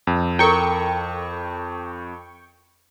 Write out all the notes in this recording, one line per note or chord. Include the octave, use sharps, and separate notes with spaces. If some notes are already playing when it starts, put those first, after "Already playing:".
F2
E4 A4 A#4 G5 C#6